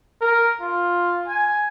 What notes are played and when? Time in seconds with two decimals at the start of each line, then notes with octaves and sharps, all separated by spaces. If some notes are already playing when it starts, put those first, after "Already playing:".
0.21 A#4
0.61 F4
1.27 G#5